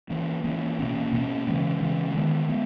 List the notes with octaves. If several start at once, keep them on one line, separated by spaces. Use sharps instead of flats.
E3 A#3 C#4
E3 A#3 C#4
B2 A#3 C#4
B2 A#3 C#4
C#3 E3 G#3 C#4
C#3 E3 G#3 C#4
D#3 G#3 B3
G#3 B3